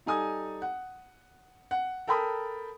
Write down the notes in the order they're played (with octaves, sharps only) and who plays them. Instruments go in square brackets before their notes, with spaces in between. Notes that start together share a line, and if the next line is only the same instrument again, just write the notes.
[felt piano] G3 D#4 A4 G#5 D#6
F#5
F#5
A4 A#4 G5 A5 B5 D#6